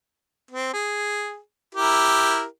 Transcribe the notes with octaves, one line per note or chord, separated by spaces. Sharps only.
C4
G#4
E4 G4 A#4